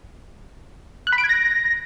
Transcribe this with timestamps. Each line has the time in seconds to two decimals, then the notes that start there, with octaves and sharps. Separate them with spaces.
1.07 F#6
1.12 B5
1.18 D7
1.24 G#6
1.29 A#6